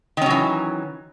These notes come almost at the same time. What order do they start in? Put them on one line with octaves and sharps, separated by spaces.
D#3 C#4 F#3 E3